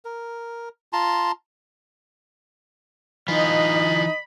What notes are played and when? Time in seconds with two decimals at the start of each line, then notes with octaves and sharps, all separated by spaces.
0.05 A#4
0.93 F4 A5 A#5 C6
3.28 E3 D#4 F4 D#5 B5